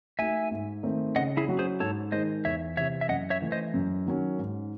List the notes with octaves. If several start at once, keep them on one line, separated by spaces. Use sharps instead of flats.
A3 D#4 F#4 E5 G#5
G#2
D#3 A3 C4 D#4
C#3 D#5 F#5
E4 G#4
F#3 C#4 F#4
G#4 C5
G#2 A4 C#5
D#3 G#3 D#4 G#4 C5 D#5
E2 C#5 E5
C3 E3 C4 C#5 E5
E5
F#2 D#5 F#5
C#5 E5
E3 A3
C5 D#5
F#2
D#3 F#3 C#4
G#2